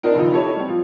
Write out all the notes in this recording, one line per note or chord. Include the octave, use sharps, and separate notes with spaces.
C4 D4 D#4 A#4
F#1 D#2 F3 D#4
E4 G4 A4 C#5 D#5
G3 C4
F3